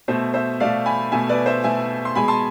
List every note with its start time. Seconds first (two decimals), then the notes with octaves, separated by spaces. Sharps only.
0.08 B2 A3 C5 E5
0.34 C5 E5
0.60 B2 A3 D5 F5
0.86 G#5 B5
1.11 B2 A3 E5 G#5
1.29 B4 D5
1.46 C5 E5
1.63 B2 A3 E5 G#5
2.05 C6
2.15 B2 G#3 G#5 B5
2.28 A5 C6